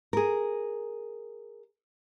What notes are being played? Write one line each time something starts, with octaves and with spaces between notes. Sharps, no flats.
G#4 A#4